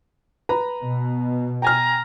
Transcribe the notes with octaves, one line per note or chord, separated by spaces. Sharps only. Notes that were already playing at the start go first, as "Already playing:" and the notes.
B4 A#5 B5
B2
G5 G#5 A#5 F6